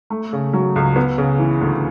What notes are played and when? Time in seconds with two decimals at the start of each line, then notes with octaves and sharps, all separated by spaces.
0.10 A3
0.33 C#3
0.54 F#3
0.76 C#2
0.96 B3
1.18 C#3
1.39 E3
1.61 D2